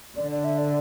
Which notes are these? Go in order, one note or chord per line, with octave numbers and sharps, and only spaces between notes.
D3 D5
D5
E5
D5